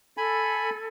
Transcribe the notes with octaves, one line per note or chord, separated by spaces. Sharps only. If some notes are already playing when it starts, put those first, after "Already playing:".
A4 G#5 B5